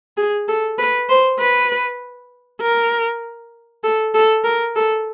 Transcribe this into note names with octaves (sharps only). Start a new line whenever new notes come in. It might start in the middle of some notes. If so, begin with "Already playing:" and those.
G#4
A4
B4
C5
B4
A#4
A4
A4
A#4
A4